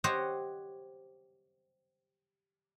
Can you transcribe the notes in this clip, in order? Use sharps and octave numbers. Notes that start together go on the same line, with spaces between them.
G4 C5 C#5 D#5 F#5